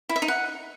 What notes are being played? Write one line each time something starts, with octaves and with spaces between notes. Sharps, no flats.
E4
E5
D#4
F#5